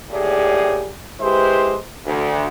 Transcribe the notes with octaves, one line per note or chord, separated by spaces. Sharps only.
D#2 A2 G4 G#4 D5
G#3 E4 G4 B4 C5
D2